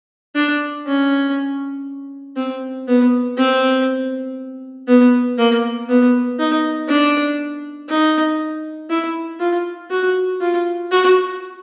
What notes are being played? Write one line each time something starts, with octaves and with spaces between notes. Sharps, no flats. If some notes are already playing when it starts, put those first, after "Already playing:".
D4
C#4
C4
B3
C4
B3
A#3
B3
D#4
D4
D#4
E4
F4
F#4
F4
F#4